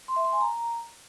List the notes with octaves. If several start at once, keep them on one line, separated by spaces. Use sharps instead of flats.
C6
E5
C6
G#5
A#5